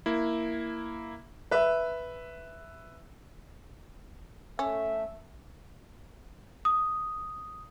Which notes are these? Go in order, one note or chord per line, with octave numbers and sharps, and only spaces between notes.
A#3 E4
B4 E5
A3 C#4 E5
D#6